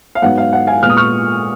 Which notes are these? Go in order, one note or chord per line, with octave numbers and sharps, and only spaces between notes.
F5
G#2 F#3 B3 F#5
F5
F#5
F5 G#5
A#2 G#3 B3 F6
D#6
C#6 F6